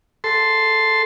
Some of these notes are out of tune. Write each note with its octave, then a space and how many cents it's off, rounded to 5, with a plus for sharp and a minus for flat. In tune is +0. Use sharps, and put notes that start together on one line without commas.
A4 +0 C6 +0